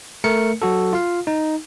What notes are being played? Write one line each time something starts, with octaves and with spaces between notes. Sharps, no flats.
A3 A#4 C#7
F#3 F#4 A4
F4 F5
D#4